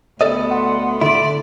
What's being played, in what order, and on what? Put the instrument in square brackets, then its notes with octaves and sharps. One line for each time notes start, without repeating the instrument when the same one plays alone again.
[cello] D2 B3 [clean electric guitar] A4 D5 D#5
[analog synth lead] F#5 [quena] C6
[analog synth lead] D3 [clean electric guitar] E4 A4 [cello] D5